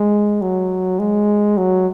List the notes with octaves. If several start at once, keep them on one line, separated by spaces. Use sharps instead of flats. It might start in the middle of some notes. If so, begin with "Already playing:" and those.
Already playing: G#3
F#3
G#3
F#3